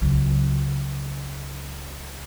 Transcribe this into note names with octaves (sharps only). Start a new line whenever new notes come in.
C#2 F#3